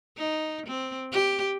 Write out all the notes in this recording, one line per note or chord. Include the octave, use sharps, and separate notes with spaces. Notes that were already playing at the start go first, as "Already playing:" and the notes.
D#4
C4
G4